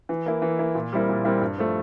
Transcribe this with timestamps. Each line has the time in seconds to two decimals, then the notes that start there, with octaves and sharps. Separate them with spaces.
0.09 E3
0.26 A#3 E4
0.42 E3
0.59 A#3 E4
0.75 A#2
0.92 G3 C4 E4 A#4
1.09 A#2
1.25 G3 C4 E4 A#4
1.41 G2
1.58 F3 A3